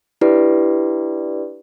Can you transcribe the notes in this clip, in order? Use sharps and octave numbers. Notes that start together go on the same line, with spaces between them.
D4 E4 G4 B4 D5